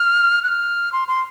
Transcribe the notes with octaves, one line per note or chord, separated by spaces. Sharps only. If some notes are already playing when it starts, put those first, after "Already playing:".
Already playing: F6
F#6
F6
C6
C6